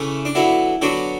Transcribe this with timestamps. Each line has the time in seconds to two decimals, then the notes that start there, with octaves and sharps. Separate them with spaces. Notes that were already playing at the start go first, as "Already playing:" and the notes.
Already playing: C#3 E3 A3 C#4
0.25 D4
0.35 D3 F#3 B3 E4
0.81 D3 F#3 B3 D4 F#4